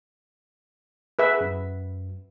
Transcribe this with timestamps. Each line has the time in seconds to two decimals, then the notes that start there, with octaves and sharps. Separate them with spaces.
1.19 G#4 B4 E5
1.40 F#2